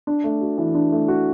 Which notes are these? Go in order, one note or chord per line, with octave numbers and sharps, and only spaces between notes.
D4
A3
F#4
E3
D4
A3
F#4